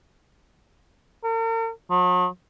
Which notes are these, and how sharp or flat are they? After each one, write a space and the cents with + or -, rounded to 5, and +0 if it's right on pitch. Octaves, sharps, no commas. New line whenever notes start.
A#4 -45
F#3 -45